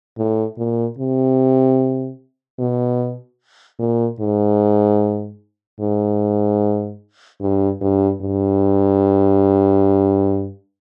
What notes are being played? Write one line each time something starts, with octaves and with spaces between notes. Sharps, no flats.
A2
A#2
C3
B2
A#2
G#2
G#2
G2
G2
G2